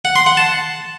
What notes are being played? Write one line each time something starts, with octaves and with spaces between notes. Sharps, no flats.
F#5
C6
F#5
A5